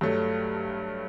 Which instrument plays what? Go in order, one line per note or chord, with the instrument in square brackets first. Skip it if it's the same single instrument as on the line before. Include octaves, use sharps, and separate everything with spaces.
[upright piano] G2 F#3 A3